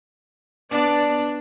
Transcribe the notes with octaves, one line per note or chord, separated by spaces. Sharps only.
B3 D4 D5